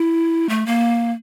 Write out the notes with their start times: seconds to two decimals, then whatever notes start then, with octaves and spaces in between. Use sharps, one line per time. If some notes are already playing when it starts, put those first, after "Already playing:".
Already playing: E4
0.49 A3
0.66 A#3